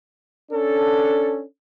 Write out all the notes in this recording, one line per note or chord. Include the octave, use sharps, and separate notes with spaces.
C#4 D4 A4